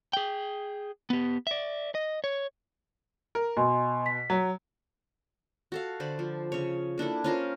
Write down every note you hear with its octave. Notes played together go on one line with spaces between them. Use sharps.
G#4 G5
B3 G4
D5 E5
D#5
C#5
A#4
B2 D#5 G#5 C6
B6
F#3
F#4 A4 F5
D3 C5 D5 B5
F3
C#3 C#5
A#3 D4 E4 A4
C#4 F4 A#4 C5